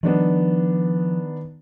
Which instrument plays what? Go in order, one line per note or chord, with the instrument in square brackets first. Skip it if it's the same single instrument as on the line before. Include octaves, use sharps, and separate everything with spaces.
[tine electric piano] D#3 [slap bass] F3 G3 [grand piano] B3 D4 D#4